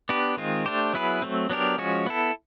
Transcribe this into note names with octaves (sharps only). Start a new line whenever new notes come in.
B3 D4 G4 B4
D#3 G#3 C4 F4
A3 D4 G4 C5
F#3 B3 E4 G#4 B4
F#3 A3 C4
F#3 B3 D4 G4 A#4
F3 G#3 C#4 F#4
B3 E4 A4